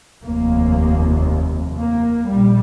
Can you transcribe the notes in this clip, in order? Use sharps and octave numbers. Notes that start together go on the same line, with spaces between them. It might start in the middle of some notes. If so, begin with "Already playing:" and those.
F1 D#2 A#3
A#3
A#1 A#2 G3